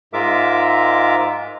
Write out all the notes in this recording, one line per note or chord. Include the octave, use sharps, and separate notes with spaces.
G#2 G#3 F4 A#4 E5 D6